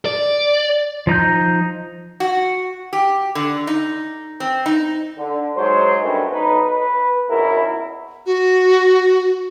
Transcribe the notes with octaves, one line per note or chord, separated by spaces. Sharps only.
D5
F3 D#4 A#5 G6
F#4
G4
D3
D#4
C4
D#4
D3
G#2 F#3 G#3 C5
F#2 C#3 G3 A3 B3 D4
B1 D#4 B4
B4
G#1 C#2 B2 E4 A#4
F#4